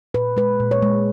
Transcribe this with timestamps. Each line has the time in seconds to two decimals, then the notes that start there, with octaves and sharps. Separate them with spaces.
0.14 A#2 B4
0.37 G#3 B4
0.60 A#2
0.71 C#5
0.83 G#3